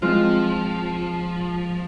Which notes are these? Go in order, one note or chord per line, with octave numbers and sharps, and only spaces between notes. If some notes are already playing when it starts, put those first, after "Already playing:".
F3 G#3 C4 F4